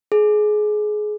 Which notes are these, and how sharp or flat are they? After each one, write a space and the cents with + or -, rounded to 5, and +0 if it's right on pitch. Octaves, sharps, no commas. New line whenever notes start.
G#4 +25